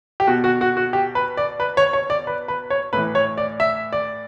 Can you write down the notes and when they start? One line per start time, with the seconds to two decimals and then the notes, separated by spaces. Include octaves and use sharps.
0.20 G4
0.27 B2 F#4
0.44 F#4
0.61 F#4
0.77 F#4
0.93 G4
1.15 B4
1.37 D5
1.60 B4
1.77 C#5
1.93 C#5
2.10 D5
2.27 B4
2.48 B4
2.70 C#5
2.93 A2 E3 B4
3.15 C#5
3.38 D5
3.60 E5
3.93 D5